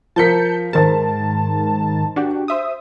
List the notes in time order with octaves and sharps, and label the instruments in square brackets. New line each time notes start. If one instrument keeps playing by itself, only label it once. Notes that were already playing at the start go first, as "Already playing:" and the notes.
[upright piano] F3 A#4 B6 [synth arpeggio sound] A5 G6 C#7
[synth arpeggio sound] G#2 D#3 A5 [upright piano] A#4 C5 A6
[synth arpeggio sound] D4 F#4 G4
C5 E5 D#6